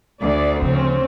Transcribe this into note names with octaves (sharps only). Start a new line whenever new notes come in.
D2 D5
C#3 F3 C4 C#4